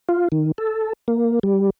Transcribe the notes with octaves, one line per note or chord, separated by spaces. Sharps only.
F4
D#3
A4
A#3
G3